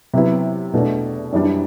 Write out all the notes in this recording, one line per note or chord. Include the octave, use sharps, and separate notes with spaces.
C3 F#3 B3 E4
E2 B2 A3 D4
F#2 E3 G3 D4